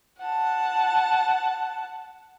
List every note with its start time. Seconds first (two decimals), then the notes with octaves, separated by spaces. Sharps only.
0.19 F#5 A5